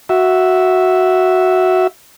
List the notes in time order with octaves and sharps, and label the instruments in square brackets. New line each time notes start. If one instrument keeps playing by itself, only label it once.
[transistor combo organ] F#4 E5